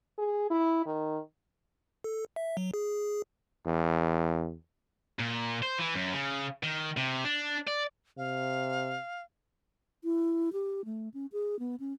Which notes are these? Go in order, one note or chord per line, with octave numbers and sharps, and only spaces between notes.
G#4
E4
D#3
A4
E5
F#3
G#4
E2
A#2
C5
E3
F#2
C#3
D#3
C3
D4
D5
C3 F5
E4
G4
A3
C#4
G#4
B3
C#4